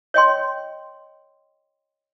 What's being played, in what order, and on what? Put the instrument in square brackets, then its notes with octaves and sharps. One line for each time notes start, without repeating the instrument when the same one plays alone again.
[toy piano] C#5 D#5 G5 C6